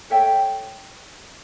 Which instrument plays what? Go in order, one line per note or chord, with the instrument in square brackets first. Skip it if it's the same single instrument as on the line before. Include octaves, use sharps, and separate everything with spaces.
[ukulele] A4 C#5 E5 G5